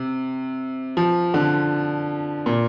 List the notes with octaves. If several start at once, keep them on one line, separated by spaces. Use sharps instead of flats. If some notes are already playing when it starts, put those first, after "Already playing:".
Already playing: C3
F3
D3
A#2